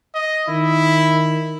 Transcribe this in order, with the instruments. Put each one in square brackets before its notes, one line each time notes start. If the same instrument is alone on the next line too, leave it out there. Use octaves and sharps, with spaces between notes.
[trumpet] D#5
[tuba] D#3 [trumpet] E4